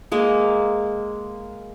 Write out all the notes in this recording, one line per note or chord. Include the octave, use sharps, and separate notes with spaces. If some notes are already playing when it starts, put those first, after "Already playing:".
G#3 A#3